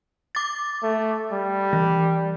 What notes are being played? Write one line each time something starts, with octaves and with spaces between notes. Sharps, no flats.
D6 A6
A3
G3
E3